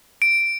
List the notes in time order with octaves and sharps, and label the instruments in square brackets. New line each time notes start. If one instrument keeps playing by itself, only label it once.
[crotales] D7